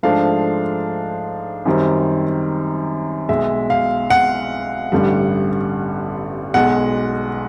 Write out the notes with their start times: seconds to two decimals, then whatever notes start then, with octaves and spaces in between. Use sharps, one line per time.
0.03 G#2 F3 A3 D4 F5
1.66 F#2 D#3 G3 C4
3.29 B1 B2 G#3 E5
3.70 F5
4.10 F#5
4.92 A1 G2 D3 G3
6.54 B1 B2 G#3 F#5